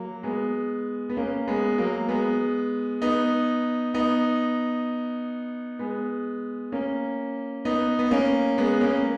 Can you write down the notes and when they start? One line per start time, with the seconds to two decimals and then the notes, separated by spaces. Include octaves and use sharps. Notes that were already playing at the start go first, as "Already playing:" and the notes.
Already playing: F#3 A#3
0.23 G#3 B3
1.09 B3
1.17 A#3 C#4
1.47 G#3 B3
1.78 F#3 A#3
2.08 G#3 B3
3.02 B3 D#4
3.94 B3 D#4
5.79 G#3 B3
6.72 A#3 C#4
7.65 B3 D#4
7.99 B3
8.11 A#3 C#4
8.58 G#3 B3
8.81 A#3 C#4